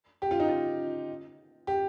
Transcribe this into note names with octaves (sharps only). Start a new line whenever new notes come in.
G4
F4
D#4
F4
G4